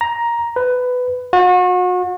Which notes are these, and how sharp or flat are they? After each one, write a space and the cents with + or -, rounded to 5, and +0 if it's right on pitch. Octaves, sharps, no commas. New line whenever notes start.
A#5 +10
B4 +15
F#4 -35